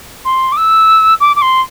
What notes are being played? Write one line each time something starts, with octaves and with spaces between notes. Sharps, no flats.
C6
D6
E6
D6
D6
C6